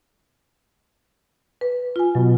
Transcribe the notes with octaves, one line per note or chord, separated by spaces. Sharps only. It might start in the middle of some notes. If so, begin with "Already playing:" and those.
B4
F4 G#5
B2 F#3